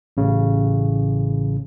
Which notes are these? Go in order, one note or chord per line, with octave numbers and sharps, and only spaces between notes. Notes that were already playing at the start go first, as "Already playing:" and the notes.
A1 C#3